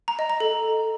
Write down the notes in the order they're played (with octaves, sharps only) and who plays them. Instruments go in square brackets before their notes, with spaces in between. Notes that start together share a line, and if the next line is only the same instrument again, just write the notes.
[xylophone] A#5
D#5
A#5
A4